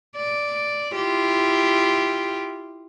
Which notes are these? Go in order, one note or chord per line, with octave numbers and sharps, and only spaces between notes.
D5
E4 F4 G4